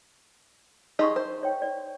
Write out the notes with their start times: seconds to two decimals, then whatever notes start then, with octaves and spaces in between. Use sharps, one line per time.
0.99 D#4 G4 G#4 D#5 C6 C#6
1.16 C5
1.43 C#5 G5
1.62 D5